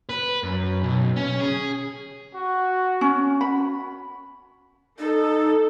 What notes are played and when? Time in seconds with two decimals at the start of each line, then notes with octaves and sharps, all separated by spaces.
0.09 B4
0.43 F#2
0.83 B1
1.16 C#4
1.40 G#4
2.34 F#4
3.01 C#4
3.41 F#4 B5
4.99 D#4 A4